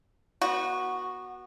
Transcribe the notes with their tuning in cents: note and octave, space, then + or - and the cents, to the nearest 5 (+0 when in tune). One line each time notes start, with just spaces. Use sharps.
B3 -25 F#4 -5